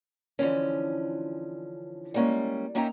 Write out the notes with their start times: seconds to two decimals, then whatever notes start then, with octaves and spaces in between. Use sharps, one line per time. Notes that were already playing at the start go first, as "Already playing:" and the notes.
0.39 D3 E3 F3 C#4
2.14 G3 G#3 A#3 C#4
2.75 A#3 C#4 D#4 E5 G5 A#5